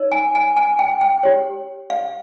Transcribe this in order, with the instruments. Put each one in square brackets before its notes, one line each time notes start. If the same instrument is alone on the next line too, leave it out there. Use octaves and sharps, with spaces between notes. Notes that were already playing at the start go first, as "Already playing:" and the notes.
Already playing: [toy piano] D#4 A#4 C#5
G#5
G#5
G#5
G5
G5
G4 C#5
F5